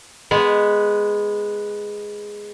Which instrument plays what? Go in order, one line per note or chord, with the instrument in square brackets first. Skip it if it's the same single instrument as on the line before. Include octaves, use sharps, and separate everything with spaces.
[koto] G#3 B3